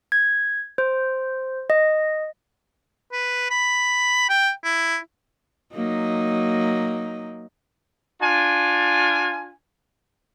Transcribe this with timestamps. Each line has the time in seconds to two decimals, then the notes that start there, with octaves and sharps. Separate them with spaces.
0.12 G#6
0.78 C5
1.70 D#5
3.12 B4
3.50 B5
4.29 G5
4.64 E4
5.74 F#3 A#3 D#4
8.22 D4 F4 G#5